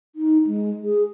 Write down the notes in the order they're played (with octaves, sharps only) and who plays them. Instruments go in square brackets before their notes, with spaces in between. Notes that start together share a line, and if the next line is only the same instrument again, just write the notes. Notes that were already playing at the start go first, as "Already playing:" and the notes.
[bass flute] D#4
G#3
G#4